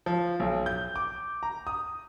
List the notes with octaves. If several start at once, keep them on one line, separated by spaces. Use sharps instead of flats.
F3
B1
G6
D6
A#5
D#6